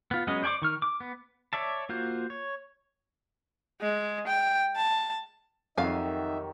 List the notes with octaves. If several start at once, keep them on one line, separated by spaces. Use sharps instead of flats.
B3 F4
F#3 G#3 B3 C#4 D#5
C5 D5 G#5 C#6 D6
D#3 C#6 F6
D6
B3
C#5 D5 E5 A5
A#3 F4 F#4 C5
C#5
G#3
G5
A5
F2 D#3 F#3 D#4 G4 E5 F5 G#5